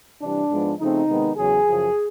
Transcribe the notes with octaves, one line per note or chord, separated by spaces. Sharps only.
C3 E3 G3 D4
G#2 F3 G#3 B3
C#3 F3 A3 C4 D#4
C3 D#3 G#3 B3
E2 C#3 F#3 G#4
F#2 C#3 F3